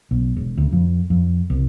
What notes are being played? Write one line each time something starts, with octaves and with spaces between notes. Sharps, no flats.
B1
E1
D2
F2
F2
C2